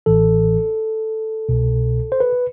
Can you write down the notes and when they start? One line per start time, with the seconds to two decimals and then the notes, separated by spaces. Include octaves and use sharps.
0.06 A1 A2 E3 A4
1.49 C2 B2
2.12 C5
2.20 B4